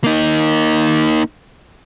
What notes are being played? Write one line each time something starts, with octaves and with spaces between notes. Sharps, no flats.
A#3 D#4